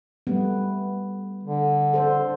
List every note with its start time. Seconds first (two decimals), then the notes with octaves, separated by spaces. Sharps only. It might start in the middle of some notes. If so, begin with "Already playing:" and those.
0.27 G3 A3 B3
1.43 D3
1.94 A4 C5